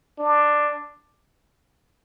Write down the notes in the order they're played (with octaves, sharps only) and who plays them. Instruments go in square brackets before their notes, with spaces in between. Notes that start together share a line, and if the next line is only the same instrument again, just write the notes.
[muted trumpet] D4